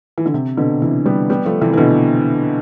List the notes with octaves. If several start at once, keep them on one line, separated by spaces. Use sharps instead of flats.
E3
D3
C3
B2 D3
C3 E3
G3 B3
G3 B3
F3 A3
C3 E3
E3
B2 D3